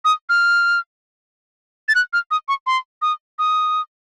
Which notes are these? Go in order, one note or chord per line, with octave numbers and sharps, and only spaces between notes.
D#6
F6
A6
F#6
F6
D#6
C#6
C6
D#6
D#6